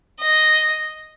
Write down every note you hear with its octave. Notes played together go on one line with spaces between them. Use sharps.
D#5